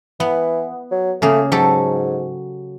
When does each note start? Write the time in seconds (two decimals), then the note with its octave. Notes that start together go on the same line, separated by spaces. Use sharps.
0.20 E3 B3
0.91 F#3
1.22 C#3 A3 A#3 G#4
1.52 G#2 F#3 G4 A4